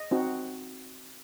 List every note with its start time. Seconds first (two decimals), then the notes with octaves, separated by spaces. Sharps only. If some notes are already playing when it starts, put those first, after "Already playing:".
Already playing: D#5
0.11 C4 D#4 F#4